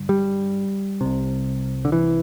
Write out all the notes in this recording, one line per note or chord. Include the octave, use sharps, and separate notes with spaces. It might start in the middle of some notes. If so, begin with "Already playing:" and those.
Already playing: G1 G2 D3
G3
C2 C3
D3
E3